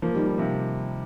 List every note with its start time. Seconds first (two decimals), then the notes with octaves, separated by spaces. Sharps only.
0.02 F3 A#3
0.15 D#3 G3
0.26 D#3 G3
0.38 C3 F3